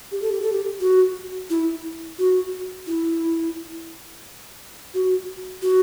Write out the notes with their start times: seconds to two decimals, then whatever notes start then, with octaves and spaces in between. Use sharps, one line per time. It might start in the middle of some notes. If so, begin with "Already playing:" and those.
0.12 G4
0.22 A4
0.32 G4
0.42 A4
0.52 G4
0.80 F#4
1.50 E4
2.19 F#4
2.87 E4
4.94 F#4
5.62 F#4